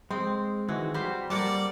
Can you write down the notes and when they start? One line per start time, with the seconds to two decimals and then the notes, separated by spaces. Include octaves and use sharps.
0.11 G#3 C4
0.68 D#3 E3 G#3 F#4
0.94 G3 F#4 G4 C5
1.30 G3 A#3 D5 F#5 A5